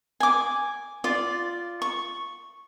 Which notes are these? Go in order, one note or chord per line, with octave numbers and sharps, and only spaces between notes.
G#5 D6
F4 D5
C#6